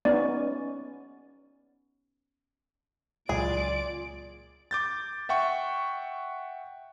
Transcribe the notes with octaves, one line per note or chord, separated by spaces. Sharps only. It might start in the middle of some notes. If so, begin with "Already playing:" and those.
B3 C#4 D#4 D5
C#2 A#2 F#3 F4 G#4 D5 D7
D6 G6 A6
E5 F#5 G5 C#6